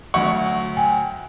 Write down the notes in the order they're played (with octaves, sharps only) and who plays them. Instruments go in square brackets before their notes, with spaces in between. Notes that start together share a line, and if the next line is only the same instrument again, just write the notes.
[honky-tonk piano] D2 F#3 [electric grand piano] F#5 [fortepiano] C#6
[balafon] G5 G#5